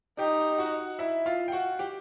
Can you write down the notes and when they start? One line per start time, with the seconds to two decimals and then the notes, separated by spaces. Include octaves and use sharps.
0.19 D#4 G4 G5
0.58 F#4 F#5
0.99 E4 E5
1.26 F4 F5
1.48 G5
1.52 F#4 F#5
1.79 G4 G5